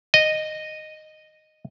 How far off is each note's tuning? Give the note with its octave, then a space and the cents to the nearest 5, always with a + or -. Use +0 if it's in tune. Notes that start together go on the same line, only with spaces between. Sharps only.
D#5 -10